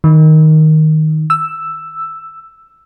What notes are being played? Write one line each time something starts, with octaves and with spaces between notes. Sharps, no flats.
D#3
E6